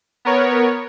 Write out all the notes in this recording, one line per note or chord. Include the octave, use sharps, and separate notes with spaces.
B3 A#4 C#5